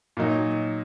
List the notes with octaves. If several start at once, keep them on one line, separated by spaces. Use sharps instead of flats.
A#2 F#3 D#4